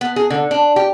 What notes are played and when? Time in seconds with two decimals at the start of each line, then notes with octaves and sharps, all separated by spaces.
0.01 B3
0.16 G#4
0.30 D3
0.51 D4
0.76 G4